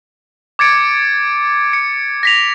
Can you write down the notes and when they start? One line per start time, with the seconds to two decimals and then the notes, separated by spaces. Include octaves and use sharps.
0.59 D6 G#6 A6 C#7 D7
1.73 C#7
2.23 A#6 B6 F7